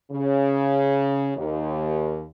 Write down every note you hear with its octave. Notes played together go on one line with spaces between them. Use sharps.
C#3
D#2